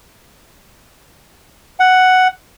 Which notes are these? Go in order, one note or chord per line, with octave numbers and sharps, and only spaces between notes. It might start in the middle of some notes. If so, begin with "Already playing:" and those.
F#5